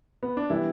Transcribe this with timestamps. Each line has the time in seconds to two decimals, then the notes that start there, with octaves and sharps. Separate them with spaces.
0.23 B3
0.37 D4
0.50 E3 G3 B3 E4